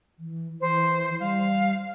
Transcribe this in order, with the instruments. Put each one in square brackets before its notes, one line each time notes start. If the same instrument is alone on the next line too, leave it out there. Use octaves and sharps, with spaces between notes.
[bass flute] E3
[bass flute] E3 [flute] C5
[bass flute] G3 [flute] F5